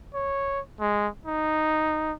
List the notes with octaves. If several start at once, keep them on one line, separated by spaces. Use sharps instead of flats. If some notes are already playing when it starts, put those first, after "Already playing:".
C#5
G#3
D#4